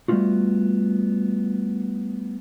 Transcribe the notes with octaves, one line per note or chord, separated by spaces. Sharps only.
G3 A3 B3 C#4 F4 F#4